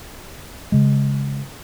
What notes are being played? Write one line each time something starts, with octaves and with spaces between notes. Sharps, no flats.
C#3 G#3